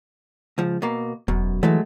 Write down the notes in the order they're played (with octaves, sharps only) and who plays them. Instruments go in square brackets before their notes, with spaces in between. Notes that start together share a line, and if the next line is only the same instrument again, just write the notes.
[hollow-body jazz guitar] C#2 F3
B2 A#3
[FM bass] E1 [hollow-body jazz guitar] F#2 B2
[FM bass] E3 [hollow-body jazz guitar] F#3 G#3 A3